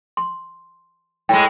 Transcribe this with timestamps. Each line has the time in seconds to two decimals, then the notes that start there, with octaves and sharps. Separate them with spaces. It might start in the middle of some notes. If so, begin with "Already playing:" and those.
0.17 C6
1.29 A2 G#3 G5